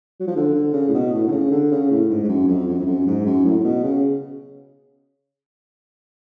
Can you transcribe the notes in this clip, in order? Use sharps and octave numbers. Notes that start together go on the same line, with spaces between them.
F#3
F3
D3
D3
C#3
A2
B2
A2
D3
C#3
D3
C#3
A2
G#2
G#2
F#2
F2
F#2
F2
F#2
G#2
F#2
A2
A2
B2
C#3